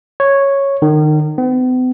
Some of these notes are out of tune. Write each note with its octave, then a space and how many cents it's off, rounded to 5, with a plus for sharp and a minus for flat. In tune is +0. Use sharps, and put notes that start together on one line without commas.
C#5 -5
D#3 -30
B3 +45